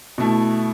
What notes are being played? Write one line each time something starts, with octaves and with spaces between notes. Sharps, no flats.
B2 A3 E4